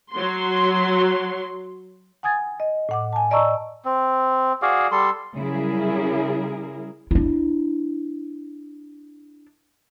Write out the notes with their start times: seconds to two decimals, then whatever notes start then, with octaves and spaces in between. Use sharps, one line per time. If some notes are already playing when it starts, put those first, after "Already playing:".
0.13 F#3 C6
2.23 F#5 G#5 D#6 G#6 A6
2.60 D#5
2.89 A2 F#5 D6
3.13 G#5 A5
3.31 D5 D#5 A5 A#5 C#6 E6
3.85 C4
4.62 F#4 G#4 D5 F5
4.92 G3 A4 C6
5.35 C#3 F#3 G3 E4 G#4 A#4
7.11 D4 E4